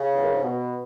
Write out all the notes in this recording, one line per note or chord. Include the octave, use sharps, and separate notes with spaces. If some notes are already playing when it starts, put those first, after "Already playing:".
Already playing: C#3
E2
F#2
G#2
B2